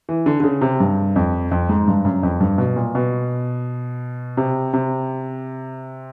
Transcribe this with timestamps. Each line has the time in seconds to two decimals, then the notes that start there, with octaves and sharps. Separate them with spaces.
0.09 E3
0.26 D3
0.40 D3
0.44 C#3
0.61 C3
0.80 G2
1.16 F2
1.51 F2
1.69 G#2
1.88 G2
2.05 F#2
2.23 F2
2.40 G2
2.58 B2
2.76 A#2
2.95 B2
4.37 C3
4.74 C3